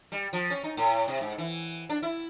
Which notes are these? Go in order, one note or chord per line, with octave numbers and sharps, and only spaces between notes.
G3
F3
C#4
D#4
A2
C3
G#2
E3
D4
E4